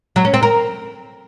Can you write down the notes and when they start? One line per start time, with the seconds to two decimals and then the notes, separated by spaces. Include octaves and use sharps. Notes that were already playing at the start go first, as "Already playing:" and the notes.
0.16 F#3
0.25 C#4
0.34 C4
0.43 A#4